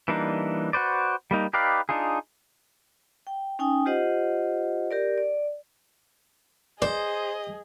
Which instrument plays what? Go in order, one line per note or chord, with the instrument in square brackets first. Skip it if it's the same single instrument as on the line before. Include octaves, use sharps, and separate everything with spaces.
[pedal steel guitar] E3 G3 A#3 D4 D#4
F#4 B4 C5 D5
G3 A#3 D#4
D#4 G4 B4 D5 F5
D4 D#4 F4 G#4
[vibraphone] G5
C#4 D#4 G5 G#5 D#6
F4 G4 C5 D#5 F#5
G4 A#4 D5
D5
[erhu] G#4 [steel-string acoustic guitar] C5 [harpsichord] D5 [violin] D#5